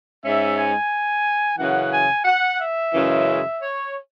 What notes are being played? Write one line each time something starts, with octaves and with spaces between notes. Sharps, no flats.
G#2 G#3 C#4 E5
G#5
F#2 C#3 E3 F#5
G#5
F#5
E5
F#2 C#3 E3 G#3
C#5